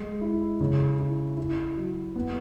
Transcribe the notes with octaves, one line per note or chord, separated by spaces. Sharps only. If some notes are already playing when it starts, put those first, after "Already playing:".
Already playing: G#3
E4
C#3
E4
E4
F#3
B3